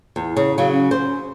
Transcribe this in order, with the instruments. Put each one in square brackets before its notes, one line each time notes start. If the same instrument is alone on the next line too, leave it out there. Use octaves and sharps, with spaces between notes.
[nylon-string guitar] E2
[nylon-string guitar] C#3 [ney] C#5
[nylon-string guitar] C#3 F#3 [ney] F5
[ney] C#4
[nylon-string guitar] C5